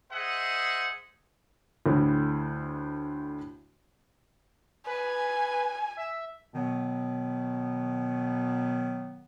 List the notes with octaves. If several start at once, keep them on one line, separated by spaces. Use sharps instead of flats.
G#4 C5 D#5 E5 F#5
D2 A2
B4 G#5
E5
B2 D#3 F#3 B3